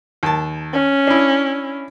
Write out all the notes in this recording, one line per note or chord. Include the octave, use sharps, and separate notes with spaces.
D#2 A5
C#4
D4 E4